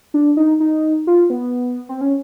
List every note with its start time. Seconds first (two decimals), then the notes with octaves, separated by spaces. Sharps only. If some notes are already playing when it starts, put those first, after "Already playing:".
0.14 D4
0.37 D#4
0.60 D#4
1.07 F4
1.30 B3
1.89 C4
2.01 C#4